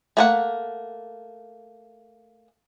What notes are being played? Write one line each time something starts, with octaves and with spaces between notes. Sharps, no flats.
A3 A#3 F#5